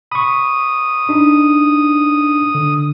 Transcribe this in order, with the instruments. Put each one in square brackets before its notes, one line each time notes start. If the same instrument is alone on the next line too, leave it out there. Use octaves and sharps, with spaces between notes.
[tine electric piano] B5 C#6 [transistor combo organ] D#6
[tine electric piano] D4 D#4
D3